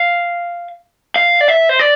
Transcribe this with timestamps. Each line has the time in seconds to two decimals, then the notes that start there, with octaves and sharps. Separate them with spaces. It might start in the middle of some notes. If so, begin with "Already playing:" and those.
Already playing: F5
1.16 F5
1.41 D5
1.48 E5
1.69 C5
1.79 D5